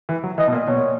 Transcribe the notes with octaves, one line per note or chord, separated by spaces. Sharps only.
E3
F#3
E3 D#5
B2
A#2
B2 C#5
A#2